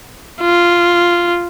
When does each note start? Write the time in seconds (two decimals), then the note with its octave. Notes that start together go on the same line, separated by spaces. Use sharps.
0.41 F4